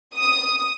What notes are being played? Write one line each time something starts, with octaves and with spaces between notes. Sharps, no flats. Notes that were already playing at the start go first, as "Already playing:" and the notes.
D#6